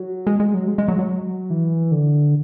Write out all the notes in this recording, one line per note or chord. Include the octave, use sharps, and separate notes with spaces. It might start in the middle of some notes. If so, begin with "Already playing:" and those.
Already playing: F#3
G#3
G#3
F#3
G#3
G#3
F#3
F#3
E3
D3